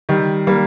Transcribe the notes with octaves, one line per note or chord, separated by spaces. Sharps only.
D#3 G3
G3 A#3